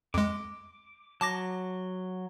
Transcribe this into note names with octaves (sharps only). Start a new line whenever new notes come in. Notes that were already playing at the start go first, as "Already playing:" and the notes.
F2 G#3 D6
F#3 A5 D6 A#6